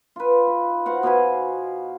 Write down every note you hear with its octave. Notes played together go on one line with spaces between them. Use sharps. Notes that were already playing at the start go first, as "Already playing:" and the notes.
F4 B4
D#4
F#4 C5 F5 F#5
B2 F5 G#5 B5